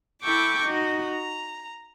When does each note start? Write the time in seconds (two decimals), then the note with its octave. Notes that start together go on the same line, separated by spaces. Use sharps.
0.23 E4 A4 G5 C#6 D6
0.63 D#4 F#4
1.09 A#5